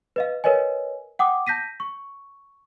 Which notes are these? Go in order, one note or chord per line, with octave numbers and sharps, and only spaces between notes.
B4 D#5 F5
A#4 B4 C#5 D#5 G#5
F#5 G5 D6 D#6
A5 G6 A#6 B6 D#7
C#6